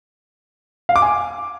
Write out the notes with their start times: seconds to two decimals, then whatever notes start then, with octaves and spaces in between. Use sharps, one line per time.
0.89 F5
0.96 D6
1.02 G#5